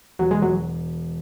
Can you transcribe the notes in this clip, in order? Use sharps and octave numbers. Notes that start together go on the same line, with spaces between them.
E1 F#3
G#3
F#3